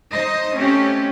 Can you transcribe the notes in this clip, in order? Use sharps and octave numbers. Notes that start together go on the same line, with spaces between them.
D#4 C5 D#5
A3 C4 C#4 G4